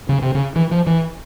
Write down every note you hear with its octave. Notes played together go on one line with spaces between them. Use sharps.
C#3
C3
C#3
E3
F3
E3